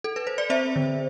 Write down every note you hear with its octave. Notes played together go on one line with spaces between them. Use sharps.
A4
B4
C5
D5
C4 C5 E5
D3